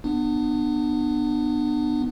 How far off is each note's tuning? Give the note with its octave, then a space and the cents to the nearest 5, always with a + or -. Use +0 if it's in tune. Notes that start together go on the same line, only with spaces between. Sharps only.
B3 +0 D4 +35